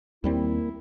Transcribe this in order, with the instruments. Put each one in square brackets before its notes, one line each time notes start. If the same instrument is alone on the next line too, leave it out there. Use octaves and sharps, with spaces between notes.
[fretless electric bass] D#2 G3 C4 [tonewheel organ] A#3 [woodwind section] E4